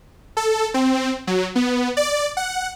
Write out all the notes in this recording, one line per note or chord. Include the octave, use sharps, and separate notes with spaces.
A4
C4
F#3
B3
D5
F#5